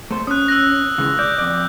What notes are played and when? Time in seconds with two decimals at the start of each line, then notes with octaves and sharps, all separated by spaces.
0.11 A3 A4 C5
0.27 C#4 D#6 F#6
0.48 E6 F#6 A#6
0.98 C#3 E3 G#3
1.19 D5 G6
1.38 F2 D5